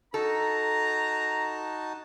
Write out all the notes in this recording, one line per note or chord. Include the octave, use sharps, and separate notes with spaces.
D#4 F#4 A4 A5 A#5